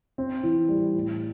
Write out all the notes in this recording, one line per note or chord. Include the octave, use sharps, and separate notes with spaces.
C4
E3
G3
A2